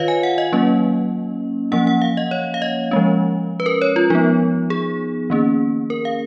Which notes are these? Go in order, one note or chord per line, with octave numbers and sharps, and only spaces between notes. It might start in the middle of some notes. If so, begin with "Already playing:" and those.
Already playing: D#3 F4 B4 C#5 D#5 F5
G#5
F#5
D#5
F#3 A#3 C#4
F3 A#3 C#4 F#5
F#5
F5
D#5
C#5
F5
D#5
F3 G#3 C#4
B4
A#4
C#5
F4
F3 B3 D#4
G#4
D#3 A#3 C#4
A#4
F5